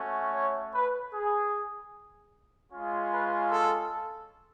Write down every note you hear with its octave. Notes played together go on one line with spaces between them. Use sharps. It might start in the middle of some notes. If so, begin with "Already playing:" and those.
Already playing: A3 C#4 F#4
C#5
B4
G#4
G#3 C#4 F4
B4
A4